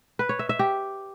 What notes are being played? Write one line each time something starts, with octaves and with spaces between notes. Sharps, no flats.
B4
C#5
E5
E5
G4